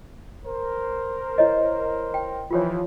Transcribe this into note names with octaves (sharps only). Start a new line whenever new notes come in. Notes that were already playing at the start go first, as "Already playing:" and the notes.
A#4 C5
E4 C#5 D#5
G5
E3 F3 F4 G4 C#5